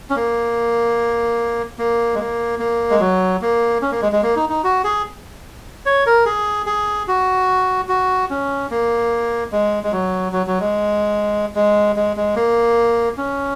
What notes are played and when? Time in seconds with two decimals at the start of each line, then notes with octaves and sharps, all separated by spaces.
0.10 C#4
0.16 A#3
1.78 A#3
2.15 G#3
2.19 A#3
2.59 A#3
2.90 G#3
3.00 F#3
3.42 A#3
3.82 C#4
3.92 A#3
4.02 G#3
4.12 G#3
4.23 A#3
4.36 D#4
4.49 D#4
4.64 F#4
4.84 G#4
5.86 C#5
6.06 A#4
6.26 G#4
6.66 G#4
7.08 F#4
7.89 F#4
8.30 C#4
8.71 A#3
9.52 G#3
9.83 G#3
9.92 F#3
10.32 F#3
10.47 F#3
10.60 G#3
11.55 G#3
11.96 G#3
12.17 G#3
12.36 A#3
13.17 C#4